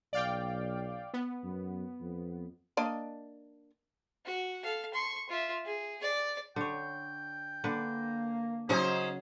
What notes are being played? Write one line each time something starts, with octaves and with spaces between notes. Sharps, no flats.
B1 D5 F5 G5
B3
F#2
F2
A#3 D4 D#5
F#4
A4 F5
C6 C#6
F4 E5
G#4
D5
D3 C#5 G5
D3 A#3 B4
C#3 F#3 C#4 D#4 G#4 C5